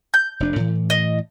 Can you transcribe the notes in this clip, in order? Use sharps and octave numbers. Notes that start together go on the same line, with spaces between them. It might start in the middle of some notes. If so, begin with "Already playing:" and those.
G6
F1 D4
A2 E3
D#5